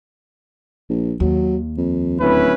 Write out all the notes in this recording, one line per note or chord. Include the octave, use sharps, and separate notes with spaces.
A#1
D#2 F#3
F2
D1 C#4 E4 B4